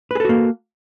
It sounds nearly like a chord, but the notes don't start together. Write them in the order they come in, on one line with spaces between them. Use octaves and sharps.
B4 G#4 A4 F#4 A#3